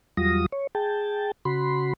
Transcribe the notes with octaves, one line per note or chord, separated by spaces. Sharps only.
E2 F#3 G3 F4 D#6 A#6
C#5
G#4 G5 A5
C#3 F#4 B5 C6